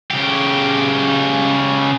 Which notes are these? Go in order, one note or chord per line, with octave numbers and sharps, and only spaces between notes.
C#3 G4